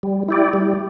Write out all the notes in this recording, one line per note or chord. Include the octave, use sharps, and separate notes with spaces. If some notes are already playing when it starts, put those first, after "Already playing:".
G3
E4 G4 D5
G3